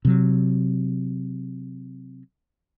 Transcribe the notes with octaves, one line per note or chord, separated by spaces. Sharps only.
C3 F#3